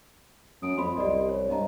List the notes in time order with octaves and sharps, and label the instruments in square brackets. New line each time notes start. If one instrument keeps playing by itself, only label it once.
[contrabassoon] F#2 [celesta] D#6 D7
[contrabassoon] F2 [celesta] B5 C6
[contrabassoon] C2 [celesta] G4 D5 D#5
[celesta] C#5
[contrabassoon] G2 [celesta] D#5 A#5